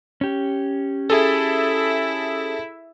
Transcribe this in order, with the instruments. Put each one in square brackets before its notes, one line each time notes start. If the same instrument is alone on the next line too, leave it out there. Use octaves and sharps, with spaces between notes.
[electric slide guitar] C#4 G4
[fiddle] E4 E5 [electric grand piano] G#4 A4